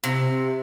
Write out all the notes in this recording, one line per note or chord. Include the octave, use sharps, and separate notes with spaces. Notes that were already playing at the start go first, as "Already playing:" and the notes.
C3